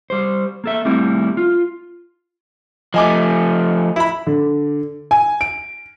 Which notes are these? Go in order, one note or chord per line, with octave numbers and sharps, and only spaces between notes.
G3 C5
A#3 A4 E5
G3 A3 C4 E4
F4
F3 A3 D#5 G#5 D6
E4 B5
D3
G#5
D7